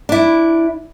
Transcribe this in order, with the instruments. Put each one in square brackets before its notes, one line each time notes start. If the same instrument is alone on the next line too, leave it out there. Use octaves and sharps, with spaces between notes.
[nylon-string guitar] D4 E4